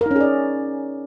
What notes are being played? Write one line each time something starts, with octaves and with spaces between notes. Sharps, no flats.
C#4 D#4 G#4 A#4 D5